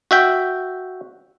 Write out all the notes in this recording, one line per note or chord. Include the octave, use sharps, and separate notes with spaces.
F#4 E5 G5